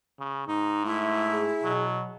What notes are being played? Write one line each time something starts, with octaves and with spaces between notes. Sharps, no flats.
C#3
G#2 D#4
A3 E4
G#4
B2 F#3